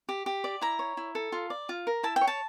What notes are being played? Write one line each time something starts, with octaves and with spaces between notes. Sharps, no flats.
G4
G4
D5
E4 A#5
C#5
E4
A4
F4
D5
F4
A#4
E4 A5
G5
C#5
A5